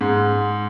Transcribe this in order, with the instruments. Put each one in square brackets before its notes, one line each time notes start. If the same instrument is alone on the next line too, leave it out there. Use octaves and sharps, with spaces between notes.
[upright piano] G#2